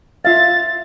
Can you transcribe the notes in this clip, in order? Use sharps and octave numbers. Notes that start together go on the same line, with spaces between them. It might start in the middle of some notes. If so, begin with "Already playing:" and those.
F4 E5 F5 A6